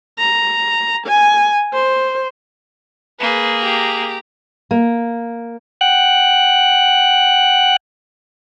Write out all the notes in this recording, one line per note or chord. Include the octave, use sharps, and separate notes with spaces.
A#5
G#5
C5
A#3 G#4 B4
G4 A#5
A#3
F#5 G5 F#6